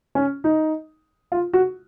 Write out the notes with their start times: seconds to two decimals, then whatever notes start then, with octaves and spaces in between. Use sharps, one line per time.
0.15 C#4
0.44 D#4
1.32 F4
1.53 F#4